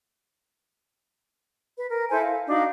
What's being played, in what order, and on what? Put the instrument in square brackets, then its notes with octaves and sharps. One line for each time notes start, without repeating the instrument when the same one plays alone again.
[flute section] B4
A#4
E4 A4 C5 G#5
F5
D4 D#4 F#4 F5